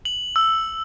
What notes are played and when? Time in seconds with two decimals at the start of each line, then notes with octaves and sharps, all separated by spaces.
0.05 F#7
0.36 E6